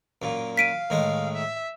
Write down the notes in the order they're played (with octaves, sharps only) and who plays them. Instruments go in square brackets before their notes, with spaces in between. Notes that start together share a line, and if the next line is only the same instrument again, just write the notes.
[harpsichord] F#2 A#2
[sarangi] F5 [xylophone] B6 D7 D#7
[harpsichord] A2 D#3 G#3
[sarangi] E5